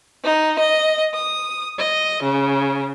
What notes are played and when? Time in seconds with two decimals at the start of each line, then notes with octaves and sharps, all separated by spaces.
0.24 D#4
0.59 D#5
1.13 D#6
1.77 D#5
2.22 C#3